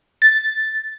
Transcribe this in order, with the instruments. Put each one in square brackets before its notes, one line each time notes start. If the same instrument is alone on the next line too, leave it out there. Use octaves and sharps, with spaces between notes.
[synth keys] A6